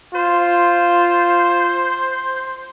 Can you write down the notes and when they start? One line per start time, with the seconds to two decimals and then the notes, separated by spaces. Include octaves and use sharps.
0.15 F4 C5